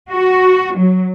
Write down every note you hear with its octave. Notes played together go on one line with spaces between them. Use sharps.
F#4
F#3